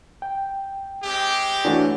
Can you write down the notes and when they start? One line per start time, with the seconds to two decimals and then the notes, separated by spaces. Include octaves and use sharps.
0.22 G5
1.03 G#3 C4 G4
1.65 E3 A3 D4 F#4 C#5